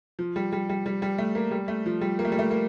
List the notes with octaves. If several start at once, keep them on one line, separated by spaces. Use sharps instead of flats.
F3
G3
G3
G3
G3
G3
A3
A#3
G3
A3
F3
G3
A#3
A3
G3
A3
A#3